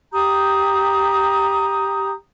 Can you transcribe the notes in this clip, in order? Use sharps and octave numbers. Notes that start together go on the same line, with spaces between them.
G4 A#5 D#6 G6